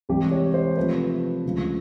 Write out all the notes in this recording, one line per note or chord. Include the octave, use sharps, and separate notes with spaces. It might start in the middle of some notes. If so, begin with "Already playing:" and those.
C2 C3 E3 G#3 C4 G4
C#5
C5
C3 F3 A3 B4
D2 C#3 F3 G#3